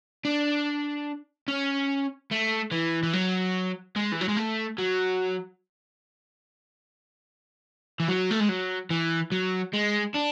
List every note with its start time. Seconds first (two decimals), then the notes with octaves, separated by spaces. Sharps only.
0.25 D4
1.48 C#4
2.31 A3
2.71 E3
3.03 E3
3.13 F#3
3.96 G#3
4.12 E3
4.21 F#3
4.29 G#3
4.37 A3
4.78 F#3
8.00 E3
8.08 F#3
8.31 A3
8.40 G#3
8.49 F#3
8.90 E3
9.32 F#3
9.73 G#3
10.15 D4